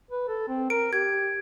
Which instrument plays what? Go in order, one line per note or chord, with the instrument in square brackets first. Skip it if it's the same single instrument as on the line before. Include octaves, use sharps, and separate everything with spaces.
[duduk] B4
A4
C4
[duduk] A#4 [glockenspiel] D7
[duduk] G4 [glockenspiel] G#6